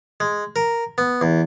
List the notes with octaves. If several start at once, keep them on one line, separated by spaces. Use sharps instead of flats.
G#3
A#4
B3
E2